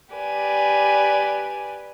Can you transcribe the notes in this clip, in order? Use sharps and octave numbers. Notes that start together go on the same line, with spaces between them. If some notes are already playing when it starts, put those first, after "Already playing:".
G4 B4 D5 G#5